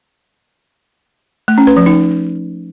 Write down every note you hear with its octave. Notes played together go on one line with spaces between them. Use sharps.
A3
C#4
B4
F3
D#4